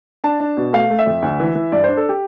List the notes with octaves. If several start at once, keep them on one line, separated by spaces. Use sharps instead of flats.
D4 A5
D4
B2
A3 F5
A3
E5
F2
D2
E3
E3
G2 D5
D4 C5
A4
G4